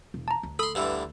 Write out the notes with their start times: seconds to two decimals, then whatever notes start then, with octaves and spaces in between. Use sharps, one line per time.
0.14 E1
0.28 A5 A#5
0.43 D2
0.59 A4 B5 C6 D#6
0.75 G2 D3 E3